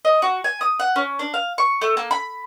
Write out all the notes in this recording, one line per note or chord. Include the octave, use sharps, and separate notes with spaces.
D#5
F#4
G#5
D#6
F#5
C#4
D4
F5
C#6
A3
A#3
B5